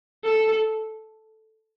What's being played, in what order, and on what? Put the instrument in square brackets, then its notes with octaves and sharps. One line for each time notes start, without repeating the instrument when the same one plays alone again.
[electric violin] A4